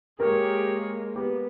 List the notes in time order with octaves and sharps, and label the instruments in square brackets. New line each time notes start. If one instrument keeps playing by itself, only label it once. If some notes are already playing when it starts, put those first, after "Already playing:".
[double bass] G#3 A#3 [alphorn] G4 [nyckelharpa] G#4 C#5 [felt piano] A#4
[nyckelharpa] B3 [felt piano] G4 [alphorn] B4